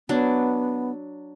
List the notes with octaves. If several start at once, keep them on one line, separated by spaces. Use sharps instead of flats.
F#3 B3 D4